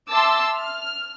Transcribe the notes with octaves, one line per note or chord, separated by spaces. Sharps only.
E5 A5 C6 D6 E6
F6